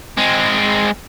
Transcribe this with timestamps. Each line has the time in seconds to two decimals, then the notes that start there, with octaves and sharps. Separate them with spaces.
0.18 G#3 C4